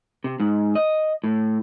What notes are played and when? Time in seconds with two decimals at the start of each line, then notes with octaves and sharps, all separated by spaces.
0.24 C3
0.40 G#2
0.75 D#5
1.24 A2